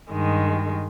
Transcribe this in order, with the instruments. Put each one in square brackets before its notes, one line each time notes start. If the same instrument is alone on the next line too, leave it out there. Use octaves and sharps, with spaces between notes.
[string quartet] G2 D#3 G#3